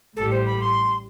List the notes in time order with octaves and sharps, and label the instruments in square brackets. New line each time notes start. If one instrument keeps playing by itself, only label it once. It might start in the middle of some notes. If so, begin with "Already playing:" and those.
[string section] A1 A2 G3 [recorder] A4
[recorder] C5
B5
C6